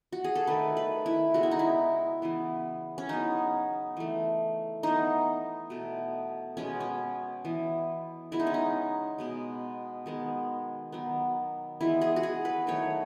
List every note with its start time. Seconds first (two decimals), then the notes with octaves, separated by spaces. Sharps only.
0.12 F#4
0.24 G#4
0.35 A4
0.47 D#3 A3 B4
0.77 B4
1.06 E4
1.34 C#3 G#3 B3 F#4
1.43 E4
1.51 D#4
1.59 E4
2.22 C#3 E3 B3
2.98 C#4
3.09 C#3 F#3 B3 D#4
3.97 E3 A3
4.83 E3 B3 D#4
5.70 B2 A3
6.57 B2 G#3 B3 C#4
6.80 C#4
7.45 E3 B3
8.32 C#3 G#3 B3 E4
8.40 D#4
8.47 C#4
8.54 D#4
9.18 B2 G#3 B3
10.06 D#3 G#3 B3
10.92 D#3 F#3 B3
11.81 E3 G#3 B3 E4
12.01 G#4
12.16 F#4
12.23 G#4
12.45 B4
12.67 D#3 F#3 A3 C#5